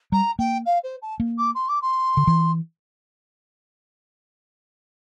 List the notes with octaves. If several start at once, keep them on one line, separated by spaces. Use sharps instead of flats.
G3 A#5
A#3 G5
F5
C5
A5
A#3
D6
C6
D6
C6
D3
E3